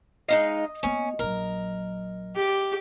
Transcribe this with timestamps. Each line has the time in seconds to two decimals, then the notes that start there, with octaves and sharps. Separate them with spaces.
0.28 G#3 D#4 D#5 F5
0.83 A#3 B3 C#4
1.19 A#1 F#3 A#4
2.36 G4